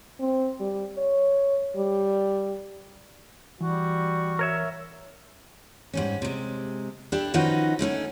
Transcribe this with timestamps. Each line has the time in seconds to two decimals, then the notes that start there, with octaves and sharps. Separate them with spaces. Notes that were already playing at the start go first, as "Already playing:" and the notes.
0.20 C4
0.60 G3
0.98 C#5
1.77 G3
3.61 E3 G3 F#4
4.39 A#4 C#5 E5
5.94 G#2 G3 C#4
6.22 C3 G#3
7.12 D4 E4 G4 A4
7.34 D#3 F3 C#4 D#4 F#4 B4
7.79 D3 A3 C#4 D#4